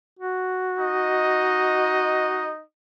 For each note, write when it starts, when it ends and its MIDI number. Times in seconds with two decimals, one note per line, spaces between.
0.19 2.50 66
0.77 2.62 63
0.77 2.62 75